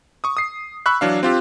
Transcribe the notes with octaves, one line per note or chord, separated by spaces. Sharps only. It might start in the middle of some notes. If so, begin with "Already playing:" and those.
C#6 D#6
D#6 C7
B5 C#6 E6 F#6
E3 F#3 D4 F5
C4 F4 G4